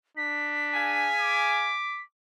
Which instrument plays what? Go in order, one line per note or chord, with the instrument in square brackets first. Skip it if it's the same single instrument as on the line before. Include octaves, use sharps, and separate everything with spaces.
[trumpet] D4 [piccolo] B6
[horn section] G#4 F5 G#5
[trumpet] D6